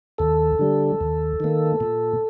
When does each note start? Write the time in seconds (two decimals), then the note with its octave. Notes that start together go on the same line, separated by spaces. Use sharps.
0.18 D#2 A4
0.59 D3 G3
1.01 D#2
1.40 D#3 A#3
1.80 A#2